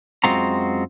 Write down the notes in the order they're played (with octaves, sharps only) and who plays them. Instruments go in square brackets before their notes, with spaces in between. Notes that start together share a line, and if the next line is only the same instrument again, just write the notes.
[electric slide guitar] F#2 G#3 C4 F4 F#4 A#5